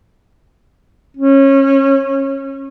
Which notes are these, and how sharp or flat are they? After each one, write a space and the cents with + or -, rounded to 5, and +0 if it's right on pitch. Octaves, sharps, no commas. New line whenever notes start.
C#4 -25